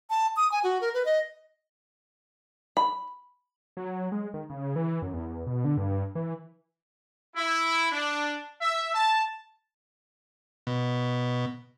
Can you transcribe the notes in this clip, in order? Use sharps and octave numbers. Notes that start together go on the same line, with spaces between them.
A5
D#6
G#5
F#4
A#4
B4
D#5
B5
F#3
G#3
D#3
C#3
E3
F#2
E2
B2
D3
G2
E3
E4
D4
E5
A5
B2